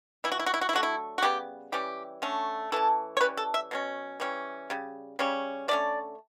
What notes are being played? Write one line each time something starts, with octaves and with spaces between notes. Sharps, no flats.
E3 B3 E4
F#4
E4
F#4
E4
F#4
E4
D3 F#3 A3 F#4
E4
F#4
C#3 G3 B3 G4
E3 G3 C#4 G4
D3 A3 C#4
E3 A3 C#4 A4
C#5
E3 G3 C#4 B4
A4
E5
B2 F#3 C#4
E3 G3 C#4
C#3 G3
C#3 G3 C#4
D3 A3 C#4 D5